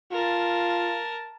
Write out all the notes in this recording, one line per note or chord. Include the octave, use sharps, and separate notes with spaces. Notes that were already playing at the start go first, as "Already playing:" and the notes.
F4 A#4 A5